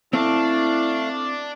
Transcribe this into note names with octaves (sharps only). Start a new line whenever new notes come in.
A3 C4 D4 E4 F5